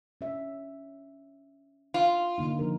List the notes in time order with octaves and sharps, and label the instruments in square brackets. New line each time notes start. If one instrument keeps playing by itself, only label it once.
[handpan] C#4 E5
[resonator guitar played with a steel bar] F4
[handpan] D3 A#3 D#4
F3 D#4 A#4